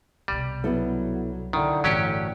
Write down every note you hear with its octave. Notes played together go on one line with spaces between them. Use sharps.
C2 B2 G3
F#3 B3 E4 A4
D3 D#3 E4
G1 A2 E3 F#3 C#4 G4 G5